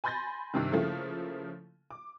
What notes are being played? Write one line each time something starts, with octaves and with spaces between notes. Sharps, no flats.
G#5 B5 C6 G6 A6 A#6
G2 C3 D#3
C#3 F3 A3 A#3 E4 A4
D6